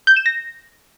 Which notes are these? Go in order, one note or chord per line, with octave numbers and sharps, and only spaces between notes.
G6
E7
A#6